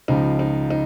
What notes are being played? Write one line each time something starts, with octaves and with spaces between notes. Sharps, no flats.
C#2 C#3 F3 D#4
D#4
D#4